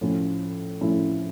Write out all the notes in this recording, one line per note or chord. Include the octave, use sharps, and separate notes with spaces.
A2 F3 C#4 E4
A2 F3 C#4 E4